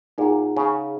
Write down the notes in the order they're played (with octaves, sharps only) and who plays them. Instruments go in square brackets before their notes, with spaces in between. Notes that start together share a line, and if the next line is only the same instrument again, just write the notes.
[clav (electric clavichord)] A#2 [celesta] D#4 G#4 F#5 A#5
[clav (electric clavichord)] C#3